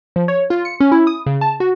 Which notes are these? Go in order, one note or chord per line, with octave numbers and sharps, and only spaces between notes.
F3
C#5
F4
C#7
C#4
E4
D#6
C#3
A5
F#4